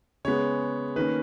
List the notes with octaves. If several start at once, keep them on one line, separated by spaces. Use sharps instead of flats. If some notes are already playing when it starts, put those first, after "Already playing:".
C#3 G#3 B3 C#5
D#3 A#3 C#4 B4